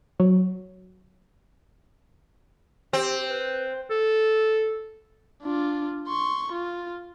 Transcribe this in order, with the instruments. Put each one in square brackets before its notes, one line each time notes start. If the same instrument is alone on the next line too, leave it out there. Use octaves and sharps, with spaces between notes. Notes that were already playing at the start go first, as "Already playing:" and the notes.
[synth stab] F#3
[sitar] C4 [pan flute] G4
[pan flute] B4
[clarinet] A4
[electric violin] D4 F4
C6 C#6
F4